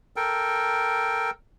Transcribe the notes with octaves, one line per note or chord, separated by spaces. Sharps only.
A4 A#4 G5